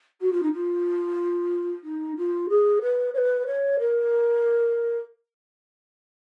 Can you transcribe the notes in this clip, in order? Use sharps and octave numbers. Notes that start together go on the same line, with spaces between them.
F#4
F4
D#4
F4
D#4
F4
G#4
B4
C#5
B4
C#5
A#4